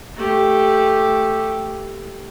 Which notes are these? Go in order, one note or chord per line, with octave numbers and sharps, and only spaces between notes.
A3 G4